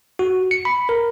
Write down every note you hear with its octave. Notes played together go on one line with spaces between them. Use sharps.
F#4
C#7
B5
A#4